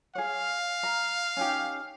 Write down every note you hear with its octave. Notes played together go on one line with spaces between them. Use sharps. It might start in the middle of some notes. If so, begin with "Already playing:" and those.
G#4 C#5 F5
A#5
C#4 D#4 G4